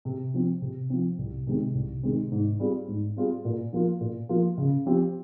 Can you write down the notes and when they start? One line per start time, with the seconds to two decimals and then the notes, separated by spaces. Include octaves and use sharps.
0.05 C3
0.34 F3 C4
0.62 C3
0.90 F3 C4
1.18 C2
1.47 C3 D#3 G#3 C4
1.75 C2
2.03 C3 D#3 G#3 C4
2.32 G#2
2.59 G3 C4 F4 G#4
2.88 G#2
3.16 G3 C4 F4 G#4
3.45 A#2
3.73 F3 A#3 F4
4.00 A#2
4.29 F3 A#3 F4
4.58 C#3
4.86 F3 C4 G4